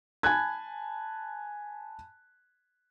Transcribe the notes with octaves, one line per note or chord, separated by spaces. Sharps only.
G#5 A5 B5 F#6 G#6